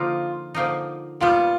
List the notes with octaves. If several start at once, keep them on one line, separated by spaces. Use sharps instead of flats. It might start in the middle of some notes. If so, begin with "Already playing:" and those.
Already playing: D3 F3 A#3 D#4 F4
D3 F3 A#3 D#4
A#2 G3 B3 F4